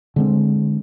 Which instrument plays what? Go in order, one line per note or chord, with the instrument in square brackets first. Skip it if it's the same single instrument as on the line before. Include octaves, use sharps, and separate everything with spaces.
[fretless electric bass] D3 G#3 C4